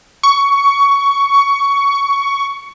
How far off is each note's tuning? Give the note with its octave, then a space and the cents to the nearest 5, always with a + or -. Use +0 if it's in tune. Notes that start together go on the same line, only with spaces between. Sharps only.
C#6 +15